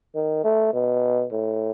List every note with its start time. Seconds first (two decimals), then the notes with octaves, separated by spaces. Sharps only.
0.15 D#3
0.44 A3
0.73 B2
1.31 A2